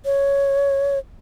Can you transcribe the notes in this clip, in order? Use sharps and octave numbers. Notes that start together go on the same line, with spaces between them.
C#5